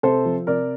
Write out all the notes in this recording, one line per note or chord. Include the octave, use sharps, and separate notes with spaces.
C3 A4 C5
F3
C3 A#4 D5